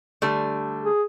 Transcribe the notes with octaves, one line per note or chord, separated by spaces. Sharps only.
D3 G3 A3
G#4